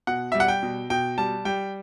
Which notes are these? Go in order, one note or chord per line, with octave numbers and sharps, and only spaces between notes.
B2 F#5
G3 E5
F#5
G5
B2
B2 G5
G3 A5
G3 G5